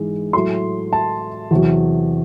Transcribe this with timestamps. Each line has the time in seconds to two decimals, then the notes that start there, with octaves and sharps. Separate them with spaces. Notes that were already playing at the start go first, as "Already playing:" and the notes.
Already playing: G#2 E3 G#3
0.33 A2 F#3 A3 C6
0.93 A5
1.51 E2 C3 F#3